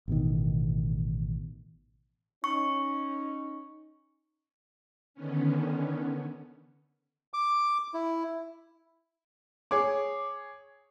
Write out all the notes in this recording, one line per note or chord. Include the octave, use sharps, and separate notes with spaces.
A1 B2 D#3
C#4 D#4 C#6
D3 D#3 B3 C#4
D6
E4
G#4 C#5 D6